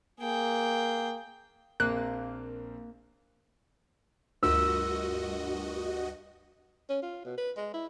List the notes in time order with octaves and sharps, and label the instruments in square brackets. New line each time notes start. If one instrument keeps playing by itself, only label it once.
[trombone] A#3 [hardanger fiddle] G#4 G5
[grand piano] A#1 C4 [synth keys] A#3 [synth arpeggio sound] F#6
[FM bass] D2 [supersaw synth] G2 F#4 D#5 [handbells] A3 F4 A#4 [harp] E6
[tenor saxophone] C#4
F4
B2
B4
G#3
E4